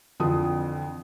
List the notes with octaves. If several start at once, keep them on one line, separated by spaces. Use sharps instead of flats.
F2 D3 E3 F4 A5 D#6